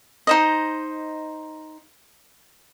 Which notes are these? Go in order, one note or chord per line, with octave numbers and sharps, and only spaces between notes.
D#4 C5 D#5